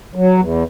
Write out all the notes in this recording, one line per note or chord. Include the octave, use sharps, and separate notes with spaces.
F#3
E2